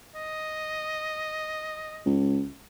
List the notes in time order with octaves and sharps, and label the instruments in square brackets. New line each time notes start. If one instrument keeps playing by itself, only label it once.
[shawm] D#5
[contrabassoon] C#2